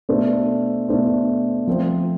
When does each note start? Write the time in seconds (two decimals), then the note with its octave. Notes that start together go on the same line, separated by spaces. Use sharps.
0.09 B2 A3 D4 A4 C5
0.89 B2 A3 D4 A4 C5
1.67 F3 A3 C4 F4 C5